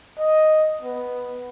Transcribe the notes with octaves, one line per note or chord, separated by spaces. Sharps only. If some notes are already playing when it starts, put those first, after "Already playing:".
D#5
B3